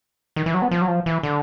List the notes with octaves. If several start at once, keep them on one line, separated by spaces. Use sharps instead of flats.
D#3
E3
F#3
B3
F3
F#3
F3
E3
D3